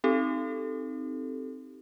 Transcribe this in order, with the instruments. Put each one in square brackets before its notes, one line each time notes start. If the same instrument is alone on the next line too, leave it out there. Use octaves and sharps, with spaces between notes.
[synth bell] C4 D#4 G4 A4